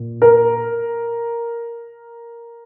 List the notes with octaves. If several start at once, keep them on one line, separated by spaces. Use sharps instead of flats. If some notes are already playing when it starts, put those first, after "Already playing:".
Already playing: A#2
A#4